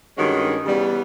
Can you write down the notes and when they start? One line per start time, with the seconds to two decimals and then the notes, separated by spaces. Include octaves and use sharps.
0.17 G2 D#3 G#3 C#4 F#4
0.65 C#3 E3 G3 B3